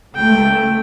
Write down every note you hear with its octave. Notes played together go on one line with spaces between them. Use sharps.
C#2 A3 G5